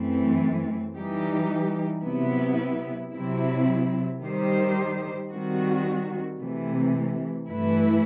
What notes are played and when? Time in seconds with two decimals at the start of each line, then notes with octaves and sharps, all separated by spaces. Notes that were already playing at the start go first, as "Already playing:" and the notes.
Already playing: F#2 E3 A3 C4
0.97 E3 G3 D#4 G4
2.04 C3 F#3 B3 E4
3.13 C3 F#3 C4 E4
4.22 D#3 G3 D#4 G4 C5
5.31 D#3 G3 C4 F#4
6.39 C3 E3 A3
7.48 G2 E3 A3 E4 B4